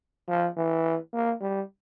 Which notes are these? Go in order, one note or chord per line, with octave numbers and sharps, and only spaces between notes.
F3
E3
A#3
G3